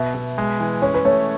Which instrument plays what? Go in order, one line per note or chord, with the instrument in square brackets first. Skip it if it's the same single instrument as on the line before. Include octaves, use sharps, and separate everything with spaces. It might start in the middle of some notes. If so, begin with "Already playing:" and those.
Already playing: [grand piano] B2 [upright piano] E5
[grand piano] B2
G#3
E3
[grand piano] C#4 [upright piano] C#5
[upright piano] B4
[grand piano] A3 [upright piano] C#5